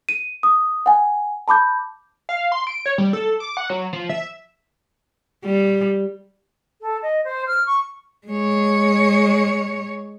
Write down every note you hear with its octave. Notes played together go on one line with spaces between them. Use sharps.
D#7
D#6
F#5 G#5
A5 B5 D6 G6
F5
C6
D7
C#5
G3
A4
D6
F#5
F#3
F3
E5
G3
A4
D#5
C5
F6
C#6
G#3 C#5